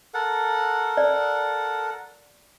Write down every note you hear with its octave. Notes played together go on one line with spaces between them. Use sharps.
A4 A#4 F#5
D5